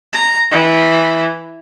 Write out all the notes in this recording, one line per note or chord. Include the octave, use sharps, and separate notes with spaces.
A#5
E3